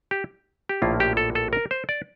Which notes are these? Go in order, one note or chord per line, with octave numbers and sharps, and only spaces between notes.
G4
G4
A#1 A2 F3 A#3 E4 F4
G4
A4
A4
A#4
C5
D5